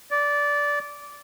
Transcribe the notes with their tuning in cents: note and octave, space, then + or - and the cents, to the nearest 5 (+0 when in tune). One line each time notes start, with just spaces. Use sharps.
D5 -15